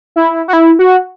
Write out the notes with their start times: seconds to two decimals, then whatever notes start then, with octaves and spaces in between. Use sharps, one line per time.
0.16 E4
0.48 F#4
0.53 E4
0.79 F#4